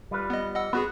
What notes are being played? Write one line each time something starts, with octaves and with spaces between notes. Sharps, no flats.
G3 F4 B4
B3 D#5
D#5 F#5 E6
B3 F#4 G#4 B4